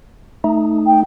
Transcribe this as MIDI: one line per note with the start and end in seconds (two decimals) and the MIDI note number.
0.44 1.03 57
0.44 1.03 63
0.87 1.00 79